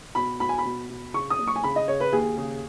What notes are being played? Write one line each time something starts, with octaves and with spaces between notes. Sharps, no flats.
B2 B5
B2 B5
G#5
B5
B2
B2
C#3 C#6
D#6
F#1
C#6
G#5
C#3 B5
D#5
C#3 C#5
B4
D#2 G#4
C#3